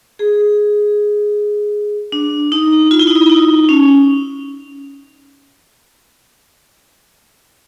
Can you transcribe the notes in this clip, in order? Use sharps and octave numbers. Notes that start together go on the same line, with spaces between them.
G#4
D4
D#4
F4
E4
D#4
E4
D#4
C#4